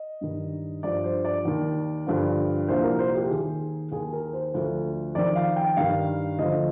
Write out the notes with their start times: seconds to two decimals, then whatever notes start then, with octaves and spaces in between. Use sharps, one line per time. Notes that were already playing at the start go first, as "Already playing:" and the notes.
Already playing: D#5
0.21 G2 D#3
0.83 G2 F3 D5
1.04 C5
1.25 D5
1.45 D#2 D#3
2.07 G2 D3 F3
2.68 C2 A#2 F3 C5
2.83 A#4
2.99 C5
3.15 G4
3.30 D#2 D#3 G#4
3.92 D#2 D#3 G#4
4.13 A#4
4.33 C5
4.54 D2 D3 F3
5.15 F2 D#3 D5
5.36 F5
5.56 G5
5.77 G2 D#3 F5
6.39 D2 D3 F3 D#5